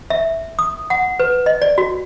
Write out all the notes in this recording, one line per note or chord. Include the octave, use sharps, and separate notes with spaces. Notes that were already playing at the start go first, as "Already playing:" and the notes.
E5
D#6
F#5
B4
D#5
D5
F#4